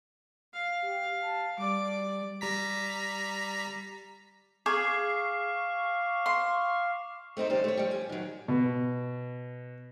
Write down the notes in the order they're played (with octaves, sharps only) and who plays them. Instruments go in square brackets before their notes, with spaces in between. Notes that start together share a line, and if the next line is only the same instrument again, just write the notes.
[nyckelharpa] F5
[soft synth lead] G4
A5
[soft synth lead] G3 [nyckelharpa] D5 D6
[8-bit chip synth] G3 A#5 B6
[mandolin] G#4 [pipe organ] F5 [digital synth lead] C#6 [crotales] D6
[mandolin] C6
[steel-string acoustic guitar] A3 C4 D#4 C5
D#2 C#3 G3 C5
A3 C#5
F3 G3
G#5
D#3 F#3
[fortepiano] B2